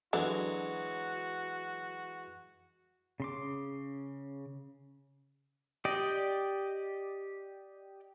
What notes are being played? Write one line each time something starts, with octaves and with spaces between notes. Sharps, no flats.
D3 E3 F#3 G#3 F#4
C#3 C6 D6
G4 D5 D#5